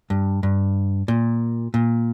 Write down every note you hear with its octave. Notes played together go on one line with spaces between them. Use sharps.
G2
G2
A#2
A#2